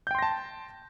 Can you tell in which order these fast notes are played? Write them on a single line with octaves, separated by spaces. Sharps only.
G6 G5 C6 A#6 A5